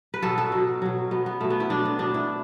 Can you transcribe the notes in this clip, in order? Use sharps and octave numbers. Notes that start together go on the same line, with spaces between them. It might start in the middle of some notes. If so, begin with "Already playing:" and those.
B4
B2 F#3 A4
A4
B2 F#3
B2 F#3
B2 F#3 B3
B3
B2 F#3 A3
B3
E4
B2 F#3 D4
B3
B2 F#3 D4
E4